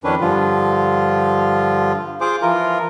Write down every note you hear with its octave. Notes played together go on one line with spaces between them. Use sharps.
F2 D#3 C#4 D4 B4
G2 D3 F3 F4
F4 G#4 C5 D6
E3 F3 F4 A#4